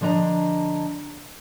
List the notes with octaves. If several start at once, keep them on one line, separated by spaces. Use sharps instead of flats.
D3 F3 D4 D#5 A#5